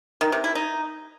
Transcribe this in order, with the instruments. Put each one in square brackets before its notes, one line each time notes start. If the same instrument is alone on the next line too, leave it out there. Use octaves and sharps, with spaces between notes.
[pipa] D#3
C3
E4
D#4